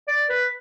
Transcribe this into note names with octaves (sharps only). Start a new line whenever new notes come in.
D5
B4